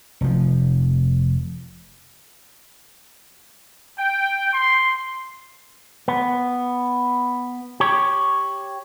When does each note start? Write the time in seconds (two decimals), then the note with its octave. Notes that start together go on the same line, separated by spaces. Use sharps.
0.21 F1 F3
3.99 G5
4.54 C6
6.08 B3
7.80 G4 C#5